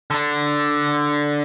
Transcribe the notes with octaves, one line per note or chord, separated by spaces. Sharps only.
D3 D4